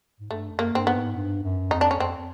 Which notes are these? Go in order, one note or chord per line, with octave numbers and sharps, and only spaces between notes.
G#2
G2 A3
F#2
A#3
G2 C4
B3
G#2
G2
F#2
F2 D#4
D4
C#4
F2 C4